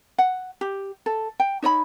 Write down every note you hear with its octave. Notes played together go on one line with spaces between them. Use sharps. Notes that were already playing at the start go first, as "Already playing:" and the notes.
F#5
G4
A4
G5
D#4 C#5 D5 B5